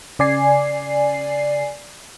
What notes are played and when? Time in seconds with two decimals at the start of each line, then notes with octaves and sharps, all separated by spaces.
0.19 C#3 D5 G#5 C7